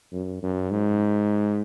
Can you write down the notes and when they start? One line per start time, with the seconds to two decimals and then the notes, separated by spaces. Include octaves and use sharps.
0.12 F#2
0.42 F#2
0.71 G#2